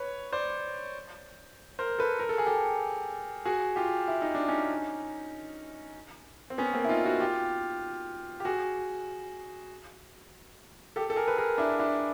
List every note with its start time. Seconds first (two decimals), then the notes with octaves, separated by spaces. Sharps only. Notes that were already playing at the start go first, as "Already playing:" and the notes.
Already playing: B4 C#5
0.33 C5 D5
1.79 A#4 C5
1.99 A4 B4
2.19 A#4
2.29 A4
2.38 G#4
2.46 G4 A4
3.45 F#4 G#4
3.76 F4 G4
4.08 E4
4.22 D#4
4.35 D4
4.49 C#4 D#4
6.50 C4
6.58 B3 C#4
6.74 A#3 C4
6.85 E4
6.89 D#4 F4
7.04 E4 F#4
7.20 F4 G4
8.40 G4
8.45 F#4 G#4
10.96 G4 A4
11.10 A4
11.16 G#4 A#4
11.28 B4
11.37 G#4 A#4
11.58 D4 E4
11.79 D4 E4